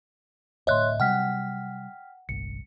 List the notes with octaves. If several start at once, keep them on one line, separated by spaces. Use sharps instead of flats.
D1 D2 A2 C#5 D#5 E5 C6 F#6
C3 F#3 G3 F#5 G5 F6 B6
G1 C2 C#7